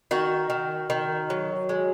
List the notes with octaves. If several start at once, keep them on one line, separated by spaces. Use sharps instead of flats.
D#3 F#4
D#3
D#3
F#3
G#3